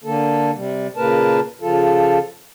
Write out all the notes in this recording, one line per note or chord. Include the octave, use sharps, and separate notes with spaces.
D3 A#3 A4
C3 G3
A#2 C#3 A#3 A#4 B4 A5
C#3 F3 F4 A4